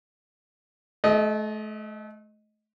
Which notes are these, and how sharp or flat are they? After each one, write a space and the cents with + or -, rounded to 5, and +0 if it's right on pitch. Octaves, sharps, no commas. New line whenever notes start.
A3 -35 D#5 +0